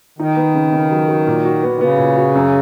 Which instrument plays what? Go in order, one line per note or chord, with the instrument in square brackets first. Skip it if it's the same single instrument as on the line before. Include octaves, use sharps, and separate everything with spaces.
[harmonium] D#3 [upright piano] D#4
[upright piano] B3
C#3
C#3
F#3
F#3
A#2
F#4
B3
[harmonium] D#3
[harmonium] C#3 [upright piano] B3
[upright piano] A#2
F#4
F#2